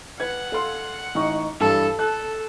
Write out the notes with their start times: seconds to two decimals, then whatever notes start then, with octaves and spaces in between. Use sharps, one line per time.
0.20 B4 F#5 G#6
0.52 A4 F5 C6
1.15 A1 D#4 C#6
1.60 G2 E3 A4
1.99 A4 F#6